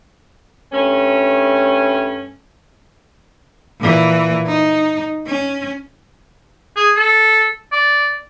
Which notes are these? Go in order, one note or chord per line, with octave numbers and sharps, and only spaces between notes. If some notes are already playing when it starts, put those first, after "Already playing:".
G2 A3 C#4
A#2 E3
D#4
C#4
G#4
A4
D5